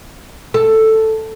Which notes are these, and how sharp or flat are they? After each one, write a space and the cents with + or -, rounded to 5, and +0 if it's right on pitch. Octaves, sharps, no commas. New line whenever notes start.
A4 +5